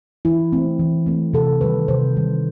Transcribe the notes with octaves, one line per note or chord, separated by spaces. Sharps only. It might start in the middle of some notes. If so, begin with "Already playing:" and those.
E3 E4
A3 C4
E3
A3 C4
C3 A4
D#3 G3 B4
C3 C5
D#3 G3